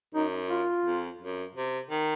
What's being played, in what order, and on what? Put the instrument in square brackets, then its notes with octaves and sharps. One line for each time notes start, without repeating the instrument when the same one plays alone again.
[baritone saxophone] F#2 [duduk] D#4
[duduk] F4
[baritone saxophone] F2
F#2
C3
D#3